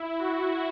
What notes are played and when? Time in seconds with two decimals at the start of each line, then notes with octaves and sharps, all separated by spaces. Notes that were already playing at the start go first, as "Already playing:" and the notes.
Already playing: E4
0.19 E4 F#4